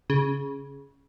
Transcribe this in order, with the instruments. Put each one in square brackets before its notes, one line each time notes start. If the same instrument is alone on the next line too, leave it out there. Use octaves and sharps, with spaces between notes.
[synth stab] C#3